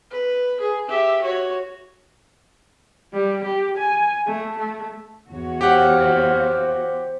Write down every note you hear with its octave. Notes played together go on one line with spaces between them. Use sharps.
B4
G#4
G4 E5
F#4 C#5
G3
G4
G#5
A3
A3
E2 F#4 C#5
G4 C5 F5 F#5